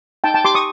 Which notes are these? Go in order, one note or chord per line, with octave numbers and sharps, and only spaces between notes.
D#4 G5 A5
G5 A5
G4 C6 D6
C#6 D#6